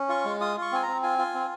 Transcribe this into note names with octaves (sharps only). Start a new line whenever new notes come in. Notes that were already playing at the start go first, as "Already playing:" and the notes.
Already playing: C#4
F4 C#6
G#3
F4 D#6
F4 C#6
C4 G#5
A#5
C4
F4 G#5
F4
C4